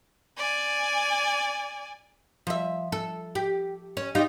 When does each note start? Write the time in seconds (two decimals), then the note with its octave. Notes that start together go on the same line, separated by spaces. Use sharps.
0.37 D5 G#5
2.47 F3 E5
2.92 A4
3.35 G4
3.97 C#4
4.15 D#4 F4 G4